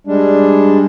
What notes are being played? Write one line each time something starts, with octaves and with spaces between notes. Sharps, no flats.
G3 G#3 D4